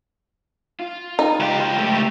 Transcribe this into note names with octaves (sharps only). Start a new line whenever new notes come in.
F4
D#4
C#2 G4
A3